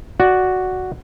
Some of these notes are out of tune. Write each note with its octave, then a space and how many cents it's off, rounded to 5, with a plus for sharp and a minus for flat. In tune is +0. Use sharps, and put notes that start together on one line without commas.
F#4 +0 D5 +0